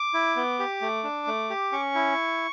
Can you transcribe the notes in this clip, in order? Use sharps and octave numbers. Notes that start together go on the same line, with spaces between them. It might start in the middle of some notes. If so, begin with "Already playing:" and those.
Already playing: D6
E4
B3
G4
A3
D4
A3
G4
C#4 C#6
E4